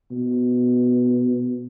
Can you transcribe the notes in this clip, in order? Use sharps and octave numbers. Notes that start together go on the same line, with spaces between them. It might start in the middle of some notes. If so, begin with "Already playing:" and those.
B2